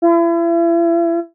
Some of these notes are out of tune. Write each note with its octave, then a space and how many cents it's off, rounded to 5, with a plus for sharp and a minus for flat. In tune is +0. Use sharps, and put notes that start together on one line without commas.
E4 +40